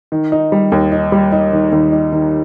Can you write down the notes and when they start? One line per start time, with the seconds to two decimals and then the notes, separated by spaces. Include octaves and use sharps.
0.12 D#3
0.32 D#4
0.52 G3
0.72 D#2
0.92 D#4
1.12 G3
1.32 D#4
1.53 D#3
1.72 D#2
1.92 D#4
2.12 D#3